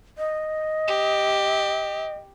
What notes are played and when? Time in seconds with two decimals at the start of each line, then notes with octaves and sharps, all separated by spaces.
0.18 D#5
0.87 G4